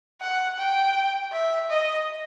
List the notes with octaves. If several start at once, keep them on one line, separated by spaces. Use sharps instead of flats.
F#5
G5
E5
D#5